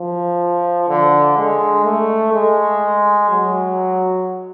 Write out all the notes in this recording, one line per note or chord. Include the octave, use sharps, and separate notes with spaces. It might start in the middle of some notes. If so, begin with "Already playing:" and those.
Already playing: F3
D3
G#3
A3
G#3
F#3